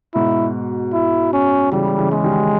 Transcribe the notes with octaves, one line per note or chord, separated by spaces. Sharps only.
G#2 B2 E4
E4
C#4
C#3 E3 G3
C#3 E3
G#3
D#3 G3
G3